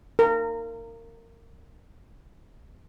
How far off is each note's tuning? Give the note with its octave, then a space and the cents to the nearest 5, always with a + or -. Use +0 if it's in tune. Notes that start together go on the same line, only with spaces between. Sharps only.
A#4 -25